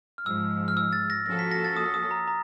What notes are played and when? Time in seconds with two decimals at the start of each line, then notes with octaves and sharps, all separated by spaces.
0.18 F6
0.26 G#2 F3 G#3 E6
0.68 F6
0.77 E6
0.93 A6
1.10 A#6
1.26 F3 A#3 C#4 F#4 A4 A#6
1.39 B6
1.52 A#6
1.65 A6
1.76 D#6
1.94 D#6
2.11 A#5
2.27 A#5